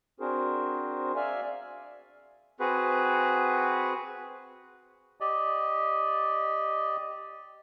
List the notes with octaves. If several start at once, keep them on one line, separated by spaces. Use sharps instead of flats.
C4 D4 F#4 G#4 A#4 C5
D5 E5 F5 G#5
C4 F#4 G#4 B4
G4 D5 D#5